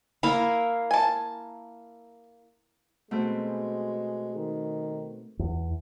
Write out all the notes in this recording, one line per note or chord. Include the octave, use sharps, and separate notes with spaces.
A#3 E4 F5 B5
G#5 A5
B2 G#3 A3 C4
D#3
E2